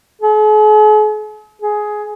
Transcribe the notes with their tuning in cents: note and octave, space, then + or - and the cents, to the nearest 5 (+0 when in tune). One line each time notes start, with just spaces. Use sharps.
G#4 +45
G#4 +15